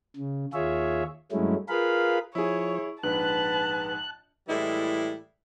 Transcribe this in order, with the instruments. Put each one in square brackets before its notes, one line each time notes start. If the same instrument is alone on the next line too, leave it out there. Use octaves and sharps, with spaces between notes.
[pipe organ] C#3
D#2 F4 G#4 C#5 E5
G2 F#3 G#3 A3 C#4 E4
F4 G#4 A#4 B4 F5 B5
[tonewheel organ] F3 [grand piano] E4 G#4 [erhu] C#5
[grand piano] A#1 G#2 [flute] B4 [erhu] A5 [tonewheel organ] F#6
[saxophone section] A2 E3 G3 G#3 E4